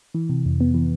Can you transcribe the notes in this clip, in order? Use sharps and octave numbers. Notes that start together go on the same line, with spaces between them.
E3
C3
F2
B3
E3